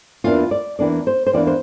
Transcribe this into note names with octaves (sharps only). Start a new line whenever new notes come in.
E2 E3 A#3 D4 F4
D5
E2 E3 A#3 D4 D5
C5
C5
E2 E3 A#3 D4 D5
C5